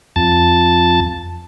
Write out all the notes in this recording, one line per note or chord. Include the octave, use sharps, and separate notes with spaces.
F2 A5